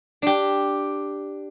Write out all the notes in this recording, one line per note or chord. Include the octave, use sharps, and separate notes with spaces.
D4 G4